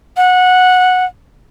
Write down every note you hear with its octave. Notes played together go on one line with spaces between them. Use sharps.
F#5